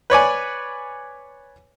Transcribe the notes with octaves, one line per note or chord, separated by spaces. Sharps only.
B4 C#5 D5 G#5